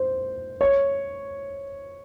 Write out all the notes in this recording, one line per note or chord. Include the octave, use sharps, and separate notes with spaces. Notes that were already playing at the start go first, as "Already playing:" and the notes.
Already playing: C5
C#5